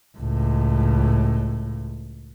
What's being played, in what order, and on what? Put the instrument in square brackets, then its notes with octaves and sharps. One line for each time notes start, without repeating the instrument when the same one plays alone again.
[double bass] C#2 A2